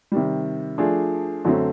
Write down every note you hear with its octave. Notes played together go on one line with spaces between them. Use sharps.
C3 D#3 G3
F3 A3 D4 F4 G#4
F#2 D3 F#3 A3 C4